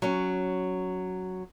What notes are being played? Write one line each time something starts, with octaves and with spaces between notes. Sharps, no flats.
F#3 C#4